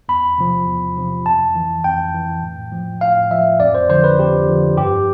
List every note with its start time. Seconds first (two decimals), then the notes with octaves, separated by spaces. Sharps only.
0.09 E2 B5
0.38 C3 F3
0.67 E2
0.97 C3 F3
1.25 F2 A5
1.55 E3
1.84 F2 G5
2.14 E3
2.43 A2
2.72 F3
3.01 A2 F5
3.31 F3 E5
3.60 F2 D5
3.75 C5
3.89 D3 F3 C5
4.04 B4
4.19 F2 G4
4.48 D3 F3
4.77 G2 G4